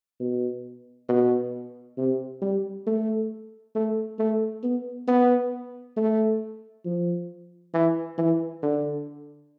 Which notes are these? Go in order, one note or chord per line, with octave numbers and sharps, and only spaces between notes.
B2
B2
C3
G3
A3
A3
A3
B3
B3
A3
F3
E3
E3
D3